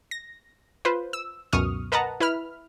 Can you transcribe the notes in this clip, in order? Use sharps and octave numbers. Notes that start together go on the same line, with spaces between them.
A#6
F4 B4 C5
E6
C#2 F#2 B2 C#6 D#6 F6
A#4 B4 D#5 F#5 A5 A#5
E4 B4 B5 F6